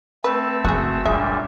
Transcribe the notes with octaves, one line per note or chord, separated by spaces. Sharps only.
A3 C4 B4 E6
F#1 F#4 G#4
F#2 A#2 G3 G#3 D4 E5